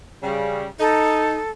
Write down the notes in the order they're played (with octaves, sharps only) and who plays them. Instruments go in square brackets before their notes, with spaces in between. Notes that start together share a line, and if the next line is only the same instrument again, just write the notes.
[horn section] C#3 G3
[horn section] D#4 [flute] A4